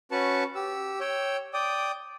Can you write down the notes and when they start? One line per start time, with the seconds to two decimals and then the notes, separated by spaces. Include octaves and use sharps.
0.11 C#4 F#4 B4 A5 C#6
0.55 G4 E6
1.00 C#5 G5 E6
1.54 D5 G5 D#6